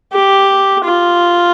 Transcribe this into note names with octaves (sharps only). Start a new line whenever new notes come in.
G4
F4